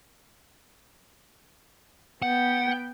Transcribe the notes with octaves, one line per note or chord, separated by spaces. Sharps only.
B3 F#5 G5